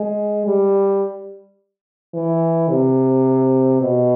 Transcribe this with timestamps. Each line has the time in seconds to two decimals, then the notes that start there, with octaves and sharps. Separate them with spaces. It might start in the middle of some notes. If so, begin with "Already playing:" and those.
Already playing: G#3
0.47 G3
2.14 E3
2.70 C3
3.81 B2